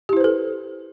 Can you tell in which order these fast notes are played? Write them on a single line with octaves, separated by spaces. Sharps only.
G4 E4 C5 B4 A4